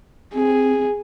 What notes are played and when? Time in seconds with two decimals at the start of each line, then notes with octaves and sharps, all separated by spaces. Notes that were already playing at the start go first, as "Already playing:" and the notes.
0.34 C4 G#4